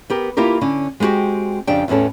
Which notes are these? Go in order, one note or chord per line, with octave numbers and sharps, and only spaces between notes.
B3 G4 A#4
A#3 E4 F4 G4 A#4
D3 C#4 D4
G#3 B3 C4 F#4 G4
F2 C#3 D4 G4 G5
E2 A2 E3 C#4 A4